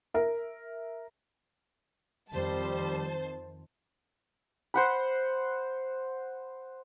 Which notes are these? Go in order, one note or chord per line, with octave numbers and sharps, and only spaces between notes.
A#4 E5
F2 D#3 G3 C5 A5
C5 F#5 B5